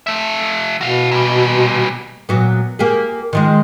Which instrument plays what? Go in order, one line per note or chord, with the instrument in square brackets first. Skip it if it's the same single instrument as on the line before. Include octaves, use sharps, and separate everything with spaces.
[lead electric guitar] F3 E5
[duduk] B2 [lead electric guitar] F#4 F5
[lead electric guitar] A#2 G3
[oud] A#2 F#3 B3
A#3 G4 G#4
D#3 F3 G#3